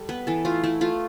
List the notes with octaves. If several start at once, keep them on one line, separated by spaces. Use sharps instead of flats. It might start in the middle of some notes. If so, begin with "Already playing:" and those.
Already playing: G3 A4
B3 B4
E3 A4
A3 F4
A3 E4
A3 F4